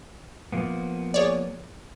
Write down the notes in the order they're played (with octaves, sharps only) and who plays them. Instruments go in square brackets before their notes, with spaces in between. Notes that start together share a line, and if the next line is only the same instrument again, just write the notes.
[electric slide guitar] F3 A#3 B3
[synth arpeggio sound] G#4 C#5 D5